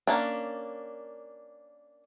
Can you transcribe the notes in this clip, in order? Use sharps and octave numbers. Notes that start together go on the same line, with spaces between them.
A#3 C#4 D4